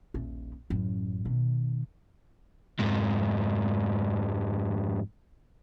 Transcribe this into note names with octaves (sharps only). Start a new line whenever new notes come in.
D#1 A#1
A1 F#2
B2 D#3
F2 G#2